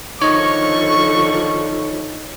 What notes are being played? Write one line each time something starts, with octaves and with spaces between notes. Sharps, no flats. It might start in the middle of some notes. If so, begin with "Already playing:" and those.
D3 D#3 F3 C#5 D#5 C#6